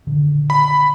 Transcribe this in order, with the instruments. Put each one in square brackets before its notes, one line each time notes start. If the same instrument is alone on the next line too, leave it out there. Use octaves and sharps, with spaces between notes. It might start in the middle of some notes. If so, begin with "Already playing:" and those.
[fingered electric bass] A#2 D3 D#3
[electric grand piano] B5